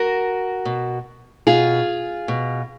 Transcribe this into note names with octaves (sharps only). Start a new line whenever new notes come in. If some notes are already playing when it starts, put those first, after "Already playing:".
Already playing: F#4 A#4
B2
B2 F4 G#4
B2